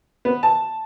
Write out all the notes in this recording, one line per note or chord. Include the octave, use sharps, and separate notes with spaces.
B3
A5